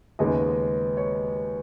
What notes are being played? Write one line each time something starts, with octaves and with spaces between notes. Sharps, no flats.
D#2 C#3 G#3 B3 D#5
C#5